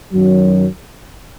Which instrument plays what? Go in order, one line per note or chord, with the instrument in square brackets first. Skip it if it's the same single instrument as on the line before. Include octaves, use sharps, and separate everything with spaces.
[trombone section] F#2 D#3 F#3